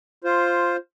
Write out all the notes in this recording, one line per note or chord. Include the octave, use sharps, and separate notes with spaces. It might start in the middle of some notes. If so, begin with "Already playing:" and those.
F4 C5